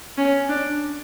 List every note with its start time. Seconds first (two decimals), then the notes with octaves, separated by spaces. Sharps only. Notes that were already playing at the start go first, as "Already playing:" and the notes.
0.18 C#4
0.49 D4